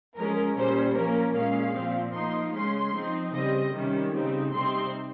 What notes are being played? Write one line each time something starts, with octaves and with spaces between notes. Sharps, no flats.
F3 G#3 C#4 A#4
A#2 G3 C#4 C5
F3 A#3 C#4 A#4
A#2 G#3 C#4 F5
A#2 F3 C4
F3 A#3 D#4 C6
C#3 G#3 C#4 C6
F3 C4 D#4
C#3 G3 C4 D#5
C3 D#3 G3 C#4
C#3 G3 C4 D#4
C3 G3 C4 D#4 C6